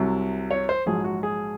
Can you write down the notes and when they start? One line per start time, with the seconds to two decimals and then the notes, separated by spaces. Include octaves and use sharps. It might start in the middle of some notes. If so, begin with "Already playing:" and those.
Already playing: C2 C3 F#3
0.51 C#5
0.69 C5
0.86 A#1 G#2 F#3 G#4
1.04 F#4
1.23 G#4